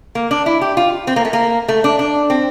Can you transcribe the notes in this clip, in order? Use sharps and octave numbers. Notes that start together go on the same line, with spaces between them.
A#3
D4
E4
G4
F4
C4
A#3
A3
A#3
A3
D4
D4
C4